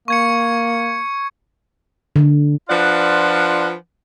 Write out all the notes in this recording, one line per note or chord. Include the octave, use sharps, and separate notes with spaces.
A#3 C#6 G#6 C#7
D3
F3 D4 F4 B4 D5 F#5